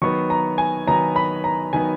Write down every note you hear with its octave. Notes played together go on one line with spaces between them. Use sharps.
D#3 F#3 B3 C#6
A#5
G#5
D#3 F#3 B3 A#5
B5
A#5
D#3 F#3 B3 G#5